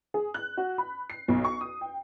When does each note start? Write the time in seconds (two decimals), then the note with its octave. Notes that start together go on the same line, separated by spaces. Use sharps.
0.14 G#4
0.34 F#6
0.57 F#4
0.78 B5
1.10 C7
1.28 B1
1.44 C#6
1.61 D#6
1.81 G5